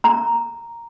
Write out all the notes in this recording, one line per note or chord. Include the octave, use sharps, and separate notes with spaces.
A#5